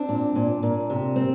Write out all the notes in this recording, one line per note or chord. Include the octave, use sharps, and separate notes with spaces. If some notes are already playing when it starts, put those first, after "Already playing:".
Already playing: C4 D4
A#2
A#2
A#2
C3
C4